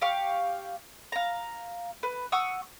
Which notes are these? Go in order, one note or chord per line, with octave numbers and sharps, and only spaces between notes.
G4 F5 C#6
F5 A#5
B4
F#5 C#6 D#6 E6